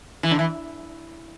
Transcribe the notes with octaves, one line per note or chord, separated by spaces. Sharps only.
E3
D3
E3